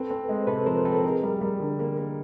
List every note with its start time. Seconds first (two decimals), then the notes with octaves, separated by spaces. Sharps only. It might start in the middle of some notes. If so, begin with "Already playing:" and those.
Already playing: C4 A4 B4
0.10 C4
0.29 G#3
0.37 C5
0.47 C3 A4 B4
0.66 F3 A#4 C5
0.85 C4 A4 B4
1.03 D#4 G#4 A#4
1.23 G3
1.41 G3
1.60 D3
1.79 A#3
1.97 A#3